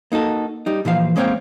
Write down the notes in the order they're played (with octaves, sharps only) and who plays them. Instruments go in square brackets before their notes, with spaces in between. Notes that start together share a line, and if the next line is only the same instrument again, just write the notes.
[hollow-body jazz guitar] A#3 D#4 F#4 A4
G3 D#4
A#2 E3 F3 F5
G#3 A#3 C4 C#5 F5 G5